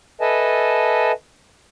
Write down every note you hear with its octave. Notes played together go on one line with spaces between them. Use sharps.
A4 B4 D#5 E5 G#5 A5